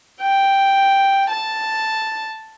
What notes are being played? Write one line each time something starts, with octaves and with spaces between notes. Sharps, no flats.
G5
A5